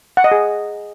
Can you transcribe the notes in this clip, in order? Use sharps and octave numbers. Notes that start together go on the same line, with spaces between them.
F#5
D#5
G#4